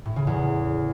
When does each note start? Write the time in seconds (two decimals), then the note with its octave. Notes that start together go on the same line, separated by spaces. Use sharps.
0.06 A2
0.16 C#3
0.27 E2